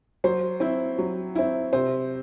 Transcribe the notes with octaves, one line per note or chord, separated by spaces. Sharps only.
F#3 C5
C4 E4
F#3
C4 E4
C3 C5